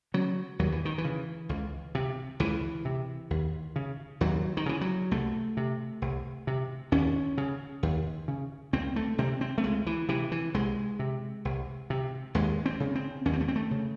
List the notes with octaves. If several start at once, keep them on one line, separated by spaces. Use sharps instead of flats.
C#3 F#3
D#2 F#3
E3
D#3
E3
C#3
C#2
C3
C#2 E3
C3
D#2
C#3
D#2 F#3
D#3
C#3 E3
F#3
C2 A3
C3
C2
C3
D#2 C#4
C#3
D#2
C#3
C#2 C4
A3
C3 C4
C4
A3
C#2 G#3
E3
C3 E3
E3
C2 G#3
C3
C2
C3
D#2 G#3
C4
C#3
C4
D#2 C#4
C4
A3
C4
A3
C#3